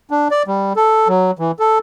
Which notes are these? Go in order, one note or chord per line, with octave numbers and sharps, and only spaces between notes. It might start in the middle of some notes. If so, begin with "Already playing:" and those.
D4
D5
G3
A4
F#3
E3
A4